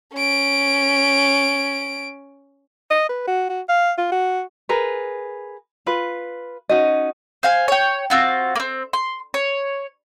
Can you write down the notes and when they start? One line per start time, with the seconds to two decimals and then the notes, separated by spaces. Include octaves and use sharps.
0.14 C#4 D7
2.91 D#5
3.09 B4
3.27 F#4
3.49 F#4
3.69 F5
3.98 F4
4.12 F#4
4.69 G#4 A#4 B4
5.86 F4 B4
6.69 C#4 D#4 F#4 D#5
7.43 C5 F5 G#5
7.68 C#5 G5
8.10 C4 F4 F#4
8.56 A#3 C4
8.93 C6
9.34 C#5